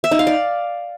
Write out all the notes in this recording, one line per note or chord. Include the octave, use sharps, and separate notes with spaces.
E5
D#4
F5
D5